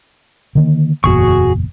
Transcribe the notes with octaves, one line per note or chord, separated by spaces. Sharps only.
D3 D#3 A#3
F#1 E2 A#2 F#4 G#4 C#6